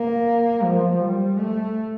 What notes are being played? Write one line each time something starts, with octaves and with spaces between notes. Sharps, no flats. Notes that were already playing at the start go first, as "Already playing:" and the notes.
Already playing: A#3
F3
G3
A3